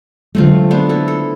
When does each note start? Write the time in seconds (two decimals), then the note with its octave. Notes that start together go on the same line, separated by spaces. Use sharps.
0.35 D3 F#3 G#3 A3 C4 F4
0.71 B3 D4 C5
0.89 E4 A4
1.08 A4